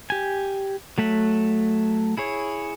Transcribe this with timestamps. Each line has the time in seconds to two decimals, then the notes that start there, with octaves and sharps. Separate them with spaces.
0.10 G4 G#5
0.98 F#3 A3 E5 F#5
2.18 E4 G#4 C#5